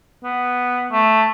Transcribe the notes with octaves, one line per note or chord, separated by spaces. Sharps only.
B3
A3